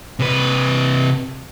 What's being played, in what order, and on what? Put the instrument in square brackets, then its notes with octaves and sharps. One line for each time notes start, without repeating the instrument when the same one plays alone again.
[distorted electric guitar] C3 B4